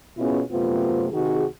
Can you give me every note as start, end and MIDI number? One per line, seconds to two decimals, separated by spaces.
0.18 0.40 47
0.18 0.40 59
0.18 0.40 61
0.18 0.40 64
0.18 0.40 65
0.18 0.40 68
0.51 1.07 42
0.51 1.07 48
0.51 1.07 57
0.51 1.07 59
0.51 1.07 60
0.51 1.07 65
1.12 1.44 48
1.12 1.44 51
1.12 1.44 63
1.12 1.44 66
1.12 1.44 68